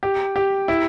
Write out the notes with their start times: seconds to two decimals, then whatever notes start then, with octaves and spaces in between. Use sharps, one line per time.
0.03 G4
0.36 G4
0.68 E4